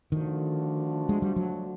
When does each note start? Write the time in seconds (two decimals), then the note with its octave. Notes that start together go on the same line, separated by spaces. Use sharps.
0.11 D3 D#3 F3 A3 D4 F#4
1.09 G#3
1.22 G3
1.36 F#3